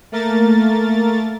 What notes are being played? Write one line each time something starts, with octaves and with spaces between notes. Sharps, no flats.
A3 A#3 A#4 A6